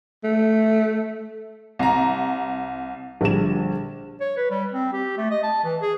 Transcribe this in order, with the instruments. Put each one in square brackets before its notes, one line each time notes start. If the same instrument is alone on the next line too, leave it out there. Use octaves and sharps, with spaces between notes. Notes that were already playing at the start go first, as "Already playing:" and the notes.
[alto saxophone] A3
[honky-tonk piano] C2 A#5
[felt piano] A#1 D3 G3 E7
[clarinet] C#5
B4
G3
C4
G4
A3
D#5
A5
E3
G#4